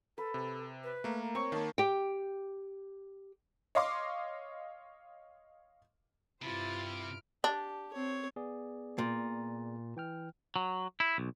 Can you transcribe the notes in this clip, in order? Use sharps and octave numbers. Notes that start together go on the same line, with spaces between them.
A4 B4
C3
B4
A3 A#3 A#4
C4 C#5 C#6
D#3 A#3 A5
G4 G5
C#5 D#5 F5 C6 D6
G2 C3 E4 F4 C5 A6
F6 D7
D4 G4
C4 C#5
B3 G#4 D5
A#2
E3 G5 F6
F#3
E4
B1